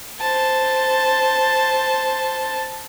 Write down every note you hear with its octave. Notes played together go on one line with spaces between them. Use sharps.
C5 A5